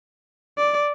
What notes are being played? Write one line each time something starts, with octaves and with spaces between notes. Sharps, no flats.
D5